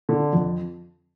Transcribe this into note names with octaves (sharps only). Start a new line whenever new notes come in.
D3
F2